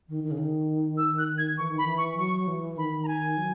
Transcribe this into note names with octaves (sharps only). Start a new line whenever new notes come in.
D#3
D#3
C#3
D#3
E6
F#6
G#6
E3 C#6
D#3
B5
E3
C#6
F#3 C#6
E3
D#3 B5
A#5
G#5
F#3